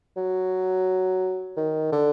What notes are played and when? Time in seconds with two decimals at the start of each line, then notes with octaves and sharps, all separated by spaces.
0.17 F#3
1.57 D#3
1.92 D3